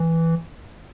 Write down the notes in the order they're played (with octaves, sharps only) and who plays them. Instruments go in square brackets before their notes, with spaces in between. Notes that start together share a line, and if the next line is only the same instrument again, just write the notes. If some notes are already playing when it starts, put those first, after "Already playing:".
Already playing: [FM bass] E3